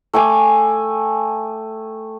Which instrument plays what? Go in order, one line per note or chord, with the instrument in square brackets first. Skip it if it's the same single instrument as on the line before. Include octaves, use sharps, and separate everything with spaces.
[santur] A3 G5 G#5 D6